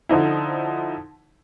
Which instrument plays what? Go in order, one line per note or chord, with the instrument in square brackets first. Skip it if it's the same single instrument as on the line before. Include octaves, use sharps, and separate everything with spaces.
[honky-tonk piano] D3 F3 D#4 E4